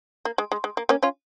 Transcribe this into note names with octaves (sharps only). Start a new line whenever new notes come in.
A#3
G#3
G#3
G#3
A#3
A#3 C#4
C#4 F4